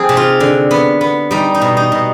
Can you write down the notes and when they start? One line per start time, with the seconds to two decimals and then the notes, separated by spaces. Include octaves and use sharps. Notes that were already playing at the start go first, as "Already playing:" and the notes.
Already playing: F3 C4 D#4 G#4
0.09 C3
0.17 F4
0.40 D3
0.71 B3
1.01 B3
1.31 G3 D#4
1.54 D#4
1.62 B2
1.77 D#4
1.92 B2